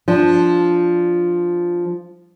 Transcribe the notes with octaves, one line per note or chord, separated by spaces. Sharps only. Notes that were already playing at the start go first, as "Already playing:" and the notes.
F3 D4